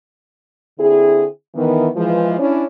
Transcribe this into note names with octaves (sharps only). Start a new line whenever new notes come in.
D3 C4 E4 G#4
D#3 E3 B3
E3 F3 G#3
C#4 D4 E4